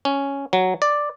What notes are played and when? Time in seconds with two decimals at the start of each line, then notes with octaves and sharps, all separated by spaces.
0.05 C#4
0.53 F#3
0.82 D5